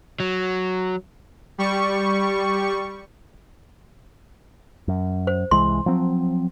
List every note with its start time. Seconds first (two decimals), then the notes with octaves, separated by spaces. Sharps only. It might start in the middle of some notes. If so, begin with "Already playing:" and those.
0.20 F#3
1.58 G3 C#6
4.88 F#2
5.27 C5
5.51 C2 E3 G#3 C6
5.86 F3 F#3 C4